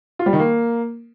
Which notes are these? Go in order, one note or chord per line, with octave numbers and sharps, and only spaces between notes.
F4
G3
D#3
A#3